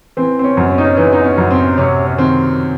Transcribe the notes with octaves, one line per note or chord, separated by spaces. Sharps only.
E3 C4
C4
C#4
F#2
C#4
D#4
C#4
E3 D#4
D#4
C#4
F#2
C4
C3 C#4
C#4
D#3 C4